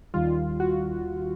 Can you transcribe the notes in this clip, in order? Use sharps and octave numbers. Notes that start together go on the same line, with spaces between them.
D#2 D#3 G3 F4
F#4